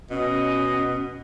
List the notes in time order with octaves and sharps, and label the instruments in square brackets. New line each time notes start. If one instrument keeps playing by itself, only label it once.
[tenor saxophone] B2 [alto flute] C#4 [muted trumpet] D#5